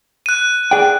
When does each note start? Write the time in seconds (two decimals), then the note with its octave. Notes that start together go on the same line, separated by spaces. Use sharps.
0.26 F#6 D#7
0.71 G#4 D5 G5